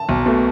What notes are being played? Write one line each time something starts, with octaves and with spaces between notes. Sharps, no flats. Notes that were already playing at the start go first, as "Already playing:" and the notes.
Already playing: A5
B1
B2 A3